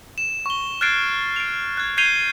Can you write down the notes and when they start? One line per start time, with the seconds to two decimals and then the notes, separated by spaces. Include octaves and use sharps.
0.18 E7
0.46 C#6 G7
0.81 F6 F#6 G#6 A6 C7 D7
1.36 D7 F7
1.77 F#6 G#6
1.97 G6 G#6 C7 D#7 F7 G7